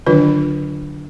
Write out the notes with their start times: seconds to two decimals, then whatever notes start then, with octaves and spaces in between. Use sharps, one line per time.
0.07 D3 D#3 F#3 D4 F4 B4